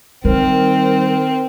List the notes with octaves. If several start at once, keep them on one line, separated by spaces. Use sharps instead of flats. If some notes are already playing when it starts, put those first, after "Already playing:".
D#3 G3 C4 A#4